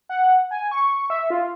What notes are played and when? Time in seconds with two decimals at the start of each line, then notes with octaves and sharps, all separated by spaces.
0.09 F#5
0.51 G#5
0.71 C#6
1.10 E5
1.30 F4